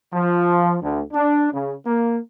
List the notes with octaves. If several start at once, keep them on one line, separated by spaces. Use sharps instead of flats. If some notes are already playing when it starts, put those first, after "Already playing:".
F3
D2
D4
C#3
A#3